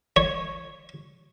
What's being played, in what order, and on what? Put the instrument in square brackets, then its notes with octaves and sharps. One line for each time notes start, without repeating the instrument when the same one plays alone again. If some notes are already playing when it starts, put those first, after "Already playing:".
[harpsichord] C#5